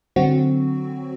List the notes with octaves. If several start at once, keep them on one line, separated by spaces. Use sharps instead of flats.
D3 F#3 C4 F#4